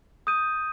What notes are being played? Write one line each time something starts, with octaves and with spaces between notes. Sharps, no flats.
D#6 G6 D#7